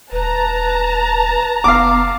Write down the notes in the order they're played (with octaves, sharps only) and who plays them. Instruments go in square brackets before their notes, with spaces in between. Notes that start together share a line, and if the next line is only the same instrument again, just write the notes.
[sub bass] D#1 [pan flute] B4 [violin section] A5 A#5
[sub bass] F#1 [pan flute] B3 [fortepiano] F5 D6